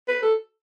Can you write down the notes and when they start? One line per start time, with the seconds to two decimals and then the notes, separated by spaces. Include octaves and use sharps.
0.08 B4
0.23 A4